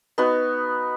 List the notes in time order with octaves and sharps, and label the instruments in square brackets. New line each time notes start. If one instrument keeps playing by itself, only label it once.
[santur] B3 D#4 F#4 B4